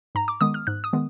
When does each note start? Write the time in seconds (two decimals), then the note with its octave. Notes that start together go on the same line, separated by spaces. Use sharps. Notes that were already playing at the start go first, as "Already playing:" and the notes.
0.15 G#2 A#5
0.28 D6
0.41 D#3 G#3 B3 D#6
0.54 F6
0.67 G#2 F#6
0.84 D#6
0.93 D#3 G#3 B3